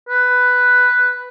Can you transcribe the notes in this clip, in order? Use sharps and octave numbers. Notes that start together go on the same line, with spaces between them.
B4